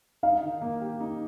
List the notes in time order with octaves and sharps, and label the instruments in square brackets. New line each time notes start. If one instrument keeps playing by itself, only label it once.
[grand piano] D#4 [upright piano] F5
[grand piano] D#3
A#3
G4
D#4